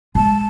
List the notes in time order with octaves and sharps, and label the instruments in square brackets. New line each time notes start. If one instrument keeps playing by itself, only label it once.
[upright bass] G#3 [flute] A5